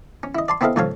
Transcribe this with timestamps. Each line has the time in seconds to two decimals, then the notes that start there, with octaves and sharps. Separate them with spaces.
0.23 C#4
0.35 E4 D#5
0.48 D5 A5 C6
0.61 B3 C4 E4 A4 D#5 F5
0.76 G#2 C#3 F3 A4 C#5 F5